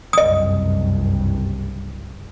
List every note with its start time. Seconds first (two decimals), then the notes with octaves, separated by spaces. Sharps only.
0.13 F#1 C2 G2 D#5 D#6